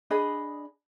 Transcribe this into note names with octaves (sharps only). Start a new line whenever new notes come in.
D4 G#4 D#5 B5